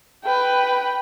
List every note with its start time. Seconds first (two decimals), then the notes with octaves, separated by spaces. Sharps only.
0.24 B4 G5